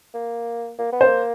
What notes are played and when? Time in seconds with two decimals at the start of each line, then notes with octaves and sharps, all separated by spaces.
0.14 A#3
0.79 A#3
0.92 B3
1.01 C5
1.06 A#3